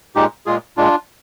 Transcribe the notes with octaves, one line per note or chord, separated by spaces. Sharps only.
A#2 G#3 D#4 G4
A#2 G#3 F4 G#4
A#2 G#3 D4 F4